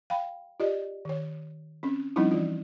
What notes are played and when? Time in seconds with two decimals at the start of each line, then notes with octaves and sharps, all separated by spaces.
0.10 F5 G5 B5
0.60 F4 G4 D5 D#5
1.05 D#3 C#5
1.83 C4 C#4
2.16 F3 G3 C4 C#4 D#4 E4
2.31 E3 F4